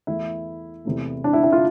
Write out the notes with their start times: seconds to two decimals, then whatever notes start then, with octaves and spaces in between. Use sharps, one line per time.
0.07 E2 E3 A3 E4
0.85 E2 C3 E3 A3
1.24 D4
1.33 E4
1.43 E4
1.52 F4